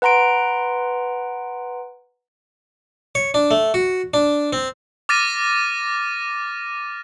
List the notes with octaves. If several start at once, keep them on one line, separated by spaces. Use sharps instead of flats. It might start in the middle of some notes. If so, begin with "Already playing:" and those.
B4 F#5 A#5 C6 D7
C#5
D4
A3
F#4
D4
C4
D6 F6 A6 A#6 D#7